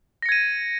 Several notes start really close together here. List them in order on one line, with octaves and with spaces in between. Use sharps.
A#6 C#7 G#6 D#7